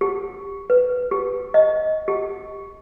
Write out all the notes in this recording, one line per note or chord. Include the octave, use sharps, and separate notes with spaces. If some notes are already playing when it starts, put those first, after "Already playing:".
G4
B4
G4
D#5
G4